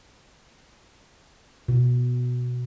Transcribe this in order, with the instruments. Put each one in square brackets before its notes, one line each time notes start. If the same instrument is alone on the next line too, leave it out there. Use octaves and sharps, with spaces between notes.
[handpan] B2